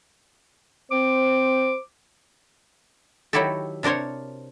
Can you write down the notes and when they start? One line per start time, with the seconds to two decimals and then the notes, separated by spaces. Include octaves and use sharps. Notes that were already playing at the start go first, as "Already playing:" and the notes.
0.91 C4 C5 D6
3.33 D#3 F#3 E4 F#4 G4 A4
3.83 C3 D4 A#4 C5 C#5